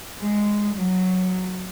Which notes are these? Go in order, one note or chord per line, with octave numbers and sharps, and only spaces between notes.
G#3
F#3